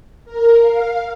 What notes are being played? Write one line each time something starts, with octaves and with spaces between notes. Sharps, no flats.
A#4
F5